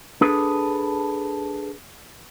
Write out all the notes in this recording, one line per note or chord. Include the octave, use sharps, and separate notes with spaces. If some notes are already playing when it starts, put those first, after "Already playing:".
D4 G#4 A4 B4